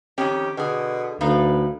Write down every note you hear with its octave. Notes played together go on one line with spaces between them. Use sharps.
F2 D#3 C#4 G4
B2 D3 G#4
D2 A2 D#4 B4 F5